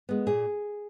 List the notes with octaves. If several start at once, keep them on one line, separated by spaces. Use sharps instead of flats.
G#3 B3
A#2 G#4